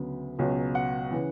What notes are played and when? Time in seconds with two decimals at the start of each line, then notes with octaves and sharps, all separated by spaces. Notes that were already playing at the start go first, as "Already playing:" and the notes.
Already playing: D2 C#3 F#3 B3
0.39 C#2 B2 F#3 C#4
0.75 F#5
1.11 C#3 E3